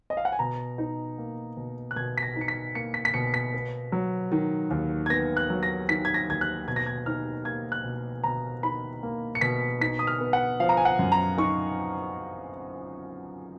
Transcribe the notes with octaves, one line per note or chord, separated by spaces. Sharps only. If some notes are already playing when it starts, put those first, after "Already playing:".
D#5
F5
F#5
G#5
B2 A#5
D#4
A#3
B2
F#6
B2 G#6
B6
A#6
D#4
C#7
B6
A#3 C#7
B6
B6
B2 C#7
B6
B3
F#3
D#3
D#2
G#6
B3 A#6
F#6
F#3
A#6
D#3 B6
G#6
A#6
D#2 G#6
F#6
B2 G#6
A#6
G#6
D#4 F6
A#3 G#6
F#6
B2
B2 A#5
D#4 B5
A#3
C#7
B2 B6
D#4 B6
D#6
F6
B3
F#5
F3 F5
A#5
G#5
F#5
F#2
A#5
D#4 C#6